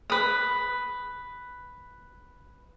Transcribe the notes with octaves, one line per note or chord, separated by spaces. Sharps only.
B4 D#6